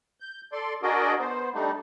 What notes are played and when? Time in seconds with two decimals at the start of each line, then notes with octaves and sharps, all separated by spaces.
0.20 G6
0.53 A4 D5 C6
0.83 D4 F#4 G#4 A#4 D5 D#5
1.20 B3 C5
1.54 G3 A3 D4 D#4